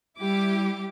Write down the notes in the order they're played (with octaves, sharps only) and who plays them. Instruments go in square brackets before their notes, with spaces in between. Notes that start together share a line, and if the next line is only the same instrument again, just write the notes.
[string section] G3 E4 G4 D6